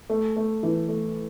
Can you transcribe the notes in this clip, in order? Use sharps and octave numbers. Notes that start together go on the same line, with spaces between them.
A3
A3
E3
A3